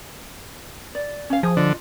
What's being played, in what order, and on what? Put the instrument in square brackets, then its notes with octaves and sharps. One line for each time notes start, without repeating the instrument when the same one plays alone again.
[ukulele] D5
C#4 F5
[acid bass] F3 [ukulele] G#4
[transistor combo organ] D3 [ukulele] F4 D#5